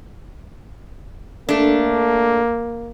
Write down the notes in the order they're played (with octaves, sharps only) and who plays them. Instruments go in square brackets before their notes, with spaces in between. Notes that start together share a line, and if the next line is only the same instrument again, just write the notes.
[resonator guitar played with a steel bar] A3 D4 [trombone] A#3